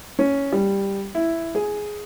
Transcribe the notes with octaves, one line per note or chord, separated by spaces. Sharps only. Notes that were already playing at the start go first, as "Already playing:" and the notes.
C#4
G3
E4
G#4